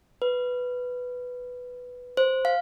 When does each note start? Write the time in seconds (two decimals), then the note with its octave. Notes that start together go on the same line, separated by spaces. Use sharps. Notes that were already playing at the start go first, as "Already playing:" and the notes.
0.22 B4
2.17 C5
2.45 F5